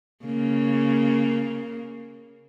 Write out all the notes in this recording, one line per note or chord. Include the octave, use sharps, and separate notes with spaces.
C#3 A#3